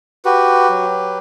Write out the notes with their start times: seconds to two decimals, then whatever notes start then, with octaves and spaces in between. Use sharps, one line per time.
0.25 F#4 G4 B4
0.69 F#3